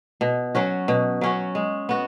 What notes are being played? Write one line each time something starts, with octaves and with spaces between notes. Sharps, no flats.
B2
F#3 C#4 F#4
B2
F#3 C#4 F#4
G#3
B3 F#4